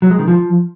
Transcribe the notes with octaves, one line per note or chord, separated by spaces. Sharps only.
F#3
G#3
D#3
F3